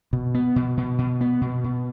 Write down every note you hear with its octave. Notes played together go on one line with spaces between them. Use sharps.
B2
B3
B2
B2
B2
B3
B2
B2